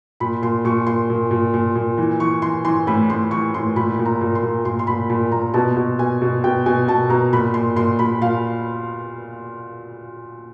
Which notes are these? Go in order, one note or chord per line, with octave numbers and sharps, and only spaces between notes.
A#2 B5
A#2 C6
A#2 C#6
A#2 C6
A#2
A#2
A#2
A#2
E3
E3 C#6
E3 C6
E3 C6
A2 B5
A2 C6
E3 C#6
A2 C6
A#2 B5
A#2
A#5
A#2
C6
A#2
A#2 C6
C6
A#2 B5
A#2 B5
A#2 A#5
B2 A5
B2
B2 G#5
B2
B2 G5
B2 G#5
B2 A5
B2 A#5
A#2 B5
A#2 C6
A#2 C6
A#2 B5
A#2 F5